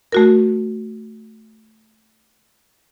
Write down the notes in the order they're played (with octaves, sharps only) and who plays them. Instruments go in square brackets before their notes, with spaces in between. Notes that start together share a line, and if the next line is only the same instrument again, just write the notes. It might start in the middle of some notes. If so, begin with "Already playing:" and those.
[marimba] A3 F#4 A#4